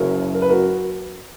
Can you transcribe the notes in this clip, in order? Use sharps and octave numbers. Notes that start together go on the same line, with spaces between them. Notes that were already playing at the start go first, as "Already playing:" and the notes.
Already playing: F#1 F#2 C#3 F#3 A#4 C#5
A#4
B4
F#4 A#4